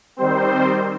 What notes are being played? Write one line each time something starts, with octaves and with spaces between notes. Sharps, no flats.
D#3 G3 C4 C5